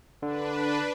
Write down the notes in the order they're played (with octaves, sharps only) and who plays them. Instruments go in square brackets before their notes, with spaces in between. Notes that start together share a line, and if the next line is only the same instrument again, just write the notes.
[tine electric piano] D3 [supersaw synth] D4 B4